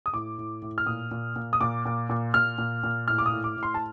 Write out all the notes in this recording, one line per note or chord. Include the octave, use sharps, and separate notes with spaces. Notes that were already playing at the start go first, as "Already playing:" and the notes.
D#6
A2 D6
A2
A2
F6
A#2 D#6
A#2
A#2
D#6
A#2 D6
A#2
A#2
A#2 F6
A#2
A#2
A2 F6
D6
D#6
A2
D6
A2
C6
A5